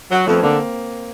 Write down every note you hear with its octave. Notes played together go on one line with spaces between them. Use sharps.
F#3
F2 A3 B3
D3 A#3 C4